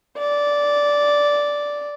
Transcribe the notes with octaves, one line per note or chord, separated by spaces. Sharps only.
D5